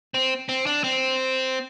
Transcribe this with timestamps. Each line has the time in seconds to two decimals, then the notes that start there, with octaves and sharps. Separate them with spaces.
0.14 C4
0.49 C4
0.66 D4
0.84 C4